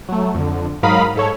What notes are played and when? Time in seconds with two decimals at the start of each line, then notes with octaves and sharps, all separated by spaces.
0.09 F#3 A3
0.34 F2 D3
0.83 G#2 F#3 A#4 F5 B5 D#6
1.15 G#2 A4 C#5